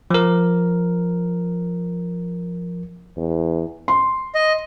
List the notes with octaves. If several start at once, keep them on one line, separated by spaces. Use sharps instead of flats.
F3 A#4
E2
C6
D#5